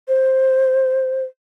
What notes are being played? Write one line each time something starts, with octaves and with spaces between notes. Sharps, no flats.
C5